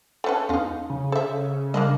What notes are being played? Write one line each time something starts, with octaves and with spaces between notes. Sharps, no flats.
A3 C#4 A4 B4 F#5
E2 C#4 D#4 F4
C#3
A4 C5 E5
G3 A#3 D4 D#5